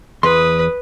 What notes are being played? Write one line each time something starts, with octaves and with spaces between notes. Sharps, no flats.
E2 B4 C6 D#6